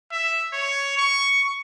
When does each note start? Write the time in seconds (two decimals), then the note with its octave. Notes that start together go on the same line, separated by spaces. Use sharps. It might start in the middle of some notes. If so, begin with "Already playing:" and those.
0.12 E5
0.53 C#5
0.98 C#6